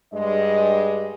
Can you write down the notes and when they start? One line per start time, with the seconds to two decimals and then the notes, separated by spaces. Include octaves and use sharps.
0.14 G2 G#3 D#5